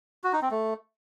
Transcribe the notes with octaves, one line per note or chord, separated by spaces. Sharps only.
F#4
D#4
C4
A3